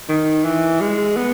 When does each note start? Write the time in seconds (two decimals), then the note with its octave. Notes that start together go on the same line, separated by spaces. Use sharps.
0.09 D#3
0.45 E3
0.80 G#3
1.16 B3